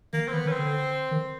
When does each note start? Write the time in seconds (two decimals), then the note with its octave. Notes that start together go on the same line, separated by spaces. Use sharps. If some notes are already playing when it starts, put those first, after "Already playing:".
0.13 D#3 A#3
0.28 C4
0.32 D#3 B3
0.45 D#3 C#4
0.52 C4
0.59 D3
1.11 D#3